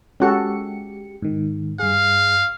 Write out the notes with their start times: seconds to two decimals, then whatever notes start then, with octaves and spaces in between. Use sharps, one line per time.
0.20 G#3 C#4 F#4 G4 A4 C#7
1.22 G#2 D#3
1.79 G2 G#4 F5